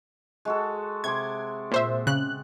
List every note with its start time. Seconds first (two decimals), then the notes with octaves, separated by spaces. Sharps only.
0.45 G#3 F#4 A4
1.04 C3 C6 D6 G#6
1.72 A#2 C5 E5
2.07 C#3 F#6